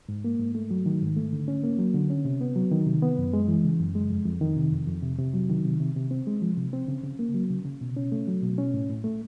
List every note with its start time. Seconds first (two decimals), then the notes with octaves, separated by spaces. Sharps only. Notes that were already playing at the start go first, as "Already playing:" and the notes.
0.09 G#2
0.24 A#3
0.40 G#2
0.55 A3
0.71 F#3
0.86 D#3
1.02 G#2
1.17 A3
1.33 D3
1.48 C#4
1.63 A#3
1.79 F#3
1.94 D3
2.10 C#4
2.25 C3
2.41 B3
2.56 F#3
2.71 D#3
2.86 C3
3.02 B3
3.18 F#2
3.33 G#3
3.48 E3
3.64 C#3
3.80 F#2
3.95 G#3
4.10 F2
4.26 F2
4.41 D#3
4.56 C3
4.72 F2
4.87 F2
5.03 C3
5.19 C3
5.34 F#3
5.49 D#3
5.65 C3
5.80 C3
5.96 C3
6.11 C4
6.27 G#3
6.42 F3
6.58 C3
6.73 C4
6.88 C#3
7.04 C#3
7.19 A#3
7.34 F#3
7.51 C#3
7.65 C#3
7.81 B2
7.97 C#4
8.12 A3
8.28 F#3
8.43 B2
8.58 C#4
8.74 A2
8.89 A2
9.04 A3